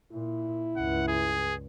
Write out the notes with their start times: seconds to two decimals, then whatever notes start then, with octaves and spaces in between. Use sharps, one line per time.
0.12 A#2 E4
0.77 C#2 G2 F#5
1.08 G#4